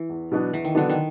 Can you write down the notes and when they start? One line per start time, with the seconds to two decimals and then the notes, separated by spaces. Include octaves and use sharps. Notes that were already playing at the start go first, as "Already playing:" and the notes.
Already playing: E3
0.10 E2
0.31 B2 F#3 B3 D4
0.53 E2 E3
0.65 D#3
0.75 B2 D3 F#3 B3 D4
0.90 D#3